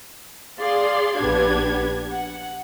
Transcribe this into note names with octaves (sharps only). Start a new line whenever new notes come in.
G#4 D5 F5 C6
A#1 B3 D4 G4 G#6
F#5